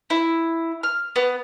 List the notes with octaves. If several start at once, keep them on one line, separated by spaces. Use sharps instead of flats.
E4
F6
B3